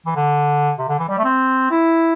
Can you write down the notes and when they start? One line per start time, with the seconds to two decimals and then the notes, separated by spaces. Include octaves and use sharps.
0.06 E3
0.16 D3
0.79 C3
0.88 D3
0.99 E3
1.09 G3
1.18 A3
1.24 C4
1.71 E4